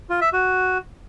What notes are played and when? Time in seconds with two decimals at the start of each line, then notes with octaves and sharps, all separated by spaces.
0.10 F4
0.21 E5
0.33 F#4